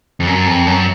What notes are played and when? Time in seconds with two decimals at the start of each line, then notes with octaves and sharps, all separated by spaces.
0.20 F2
0.27 F#2
0.47 F2
0.67 F#2